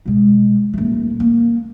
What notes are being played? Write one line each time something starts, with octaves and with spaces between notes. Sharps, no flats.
B2 G#3
D#1 A3
A#3